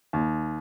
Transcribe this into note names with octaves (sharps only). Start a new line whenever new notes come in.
D#2